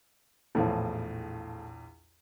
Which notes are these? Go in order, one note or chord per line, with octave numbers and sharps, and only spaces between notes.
A#1 E2 A2 F3